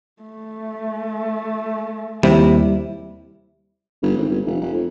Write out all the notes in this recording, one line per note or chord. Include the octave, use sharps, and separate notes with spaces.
A3
D#2 C3 G3 E4
G1
G#1
G1
F1
F1
F2